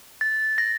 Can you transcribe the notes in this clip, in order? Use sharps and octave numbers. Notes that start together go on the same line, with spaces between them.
A6
A#6